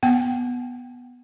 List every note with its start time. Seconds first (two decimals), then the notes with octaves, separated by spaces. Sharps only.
0.03 B3 F#5 G5